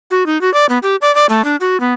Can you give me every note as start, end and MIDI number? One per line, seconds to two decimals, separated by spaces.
0.11 0.26 66
0.26 0.40 63
0.41 0.52 66
0.54 0.66 74
0.69 0.78 59
0.83 0.96 67
1.02 1.14 74
1.15 1.26 74
1.29 1.44 57
1.44 1.56 62
1.61 1.79 66
1.80 1.94 59